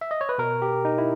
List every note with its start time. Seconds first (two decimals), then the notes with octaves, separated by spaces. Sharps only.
0.01 E5
0.11 D#5
0.21 C#5
0.29 B4
0.38 B2 A#4
0.62 G4
0.85 D#4
0.98 E4